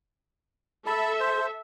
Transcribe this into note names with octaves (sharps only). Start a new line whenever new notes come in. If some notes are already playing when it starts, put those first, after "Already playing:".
A4 E5 A5 B5
C5